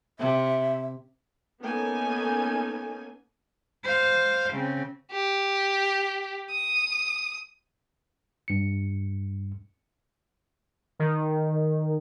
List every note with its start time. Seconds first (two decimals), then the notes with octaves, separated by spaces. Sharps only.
0.19 C3 E5
1.62 A#3 B3 C#4 D#4 A4 G#5
3.84 C5 F5
4.53 C#3 C4
5.12 G4
6.50 D#6
8.48 G2 C#7
10.99 D#3